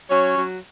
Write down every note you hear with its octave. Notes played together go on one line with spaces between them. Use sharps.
F#3 C#4 C#5
F#3